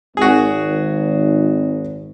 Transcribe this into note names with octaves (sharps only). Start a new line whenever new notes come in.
G#1 F#4 G#4